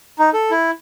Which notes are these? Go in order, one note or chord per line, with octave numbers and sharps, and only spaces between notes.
D#4
A4
E4